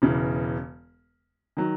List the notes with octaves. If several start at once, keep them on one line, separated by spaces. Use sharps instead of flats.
E1 E2 C#3 E3
D#3 F#3